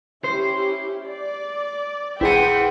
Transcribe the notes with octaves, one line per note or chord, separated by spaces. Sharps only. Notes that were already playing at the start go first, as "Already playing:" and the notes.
C#4 E4 G4 C5
D5
A#1 E4 G#4 B4 C5 F#5 G5 D#7